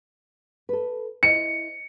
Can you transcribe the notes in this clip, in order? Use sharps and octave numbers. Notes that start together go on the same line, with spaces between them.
A4 B4
E4 C5 D#5 C#7